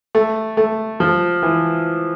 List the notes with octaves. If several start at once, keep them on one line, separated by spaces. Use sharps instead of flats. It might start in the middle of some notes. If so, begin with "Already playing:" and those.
A3
A3
F3
E3